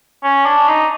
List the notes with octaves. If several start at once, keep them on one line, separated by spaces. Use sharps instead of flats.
C#4
D4
D#4